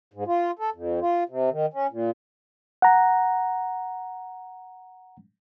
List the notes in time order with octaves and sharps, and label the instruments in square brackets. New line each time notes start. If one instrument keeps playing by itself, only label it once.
[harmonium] G#2
F4
A4
F2
F4
C3
D#3
C#4
A#2
[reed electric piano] F#5 A#5